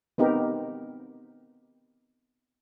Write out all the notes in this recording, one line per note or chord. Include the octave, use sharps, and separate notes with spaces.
B3 C4 D#4 G4 A#4